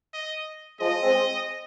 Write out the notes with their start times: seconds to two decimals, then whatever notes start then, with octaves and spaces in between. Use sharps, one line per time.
0.13 D#5
0.80 F3 G#3 D#5
1.03 G#3 C4